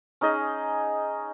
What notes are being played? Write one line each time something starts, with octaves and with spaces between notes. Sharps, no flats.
C#4 D#4 G#4 D#5